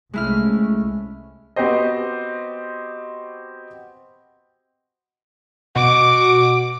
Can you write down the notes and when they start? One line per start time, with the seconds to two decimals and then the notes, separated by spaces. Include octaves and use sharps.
0.14 C2 G#3 A3 C#4 E4 F6
1.56 B3 C4 F#4 G4 C5 D#5
5.76 B2 F#4 D6 D7